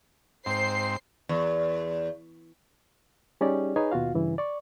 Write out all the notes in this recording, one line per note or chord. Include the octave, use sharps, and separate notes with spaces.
G#2 C4 C5 C7
E2
G3 C#4 D#4 G4 G#4 D5
D#4 G#4 B4 C#5 G#5
D#2 B2 F4 F#4 F5
G2 C#3 E3 E4
D5 C#6